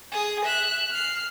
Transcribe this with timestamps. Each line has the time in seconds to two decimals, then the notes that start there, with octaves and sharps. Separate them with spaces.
0.12 G#4 D#6
0.45 E5 F#6
0.91 F6 C7